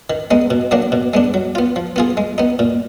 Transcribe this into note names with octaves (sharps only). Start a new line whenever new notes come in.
D#3
G#3 B3 D#4
B2
F#3 A#3 D4 F#4
B2
G#3 B3 D4
F#3
B3 F4
F3
B3 F4 G#4
G#3
B3 D#4
A#2